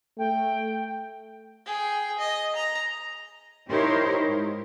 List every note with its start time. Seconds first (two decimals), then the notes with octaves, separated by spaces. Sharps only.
0.18 A3 G5
1.66 G#4 G5
2.19 D#5
2.56 A#5
3.68 D#4 E4 G4 A#4 C5 C#5
4.27 G#2